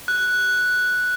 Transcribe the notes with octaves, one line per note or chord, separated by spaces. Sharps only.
F#6